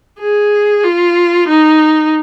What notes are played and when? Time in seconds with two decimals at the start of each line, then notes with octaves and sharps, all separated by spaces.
0.19 G#4
0.84 F4
1.48 D#4